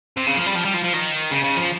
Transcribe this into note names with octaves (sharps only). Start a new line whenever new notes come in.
C3
C#3
F3
G3
F3
G3
F3
F3
D#3
C#3
C#3
F3